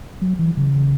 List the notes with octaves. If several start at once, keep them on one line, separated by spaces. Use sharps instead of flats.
F#3
E3
C#3